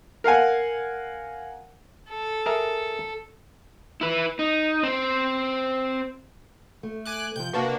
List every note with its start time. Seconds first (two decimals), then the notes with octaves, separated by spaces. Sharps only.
0.24 A#4 F5 F#5 G#5
2.10 A4
2.46 G#4 A#4 E5
4.01 E4 B4
4.39 D#4
4.83 C4 C5
6.83 A3
7.05 G#5 D6 F#6
7.36 C3 F3 G6
7.53 C3 A#3 D4 F#4 B4